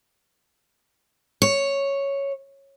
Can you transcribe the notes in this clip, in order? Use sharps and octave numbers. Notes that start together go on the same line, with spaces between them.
C#5